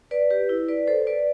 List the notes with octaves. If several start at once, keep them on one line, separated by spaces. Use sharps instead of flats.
B4 D5
G4 B4
E4
B4 D5
A4 C5
B4 D5